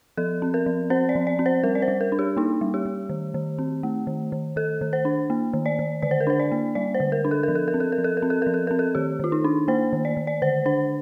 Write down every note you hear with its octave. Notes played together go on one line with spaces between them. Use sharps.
F3 A4
C4
A#4
F3
C4 C5
D5
F3
D5
C4
C5
G3 A#4
D5
C5
G3
A#4
D4
G4
A#3 D#4
G3
G4
G3
D#3
D#3
C4
A3
D#3
D#3
D#3 A4
D#3
C5
D4
A#3
D#3
D5
D#3
D3 D5
C5
A#4
D4 C5
D5
A#3
G3 D5
C5
D3
A#4
D4
A4
A#4
F3
A4
A#4
C4
A4
A#4
F3
A4
A#4
C4
A4
F3 A#4
A4
C4 A#4
A4
D#3 G4
D#3 F4
D#4
D4
A#3 C5
D#3
D5
D#3
D5
D3 C5
D4 C5